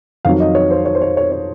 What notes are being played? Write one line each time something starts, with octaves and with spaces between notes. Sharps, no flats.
F2 D#3 F#3 F5
D#5
C#5
C5
C#5
C5
C#5
C#5
C#5